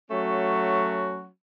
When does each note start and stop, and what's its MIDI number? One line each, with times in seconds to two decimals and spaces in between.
0.10 1.26 54
0.10 1.26 57
0.10 1.26 61
0.10 1.26 66